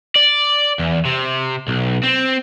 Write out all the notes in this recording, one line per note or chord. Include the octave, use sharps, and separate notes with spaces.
D5
E2
C3
B1
C4